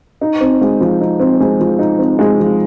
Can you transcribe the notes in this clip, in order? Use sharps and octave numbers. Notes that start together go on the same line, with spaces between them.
D#4
C4
G#3
F3
D#4
C4
G#3
F3
D#4
C4
G#3
F3